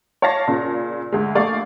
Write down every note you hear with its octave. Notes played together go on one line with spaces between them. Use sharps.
C#5 D5 F5 A5 A#6
A#2 C#3
D2 G#3
A#1 A3 D5 F5 C#6